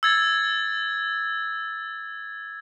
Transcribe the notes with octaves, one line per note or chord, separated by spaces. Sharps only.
E6 G#6 A6